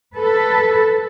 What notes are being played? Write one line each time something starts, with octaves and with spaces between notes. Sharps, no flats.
A4 B4